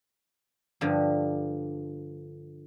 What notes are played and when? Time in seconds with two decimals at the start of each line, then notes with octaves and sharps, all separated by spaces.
0.81 G2 D3 F3